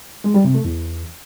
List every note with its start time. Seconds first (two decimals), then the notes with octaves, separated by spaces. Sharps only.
0.24 G#3
0.34 G3
0.44 C3
0.55 A3
0.65 E2